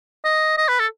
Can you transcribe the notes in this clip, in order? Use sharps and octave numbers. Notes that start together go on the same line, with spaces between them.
D#5
D#5
B4
A4